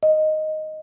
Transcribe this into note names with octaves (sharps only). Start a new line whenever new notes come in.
D#5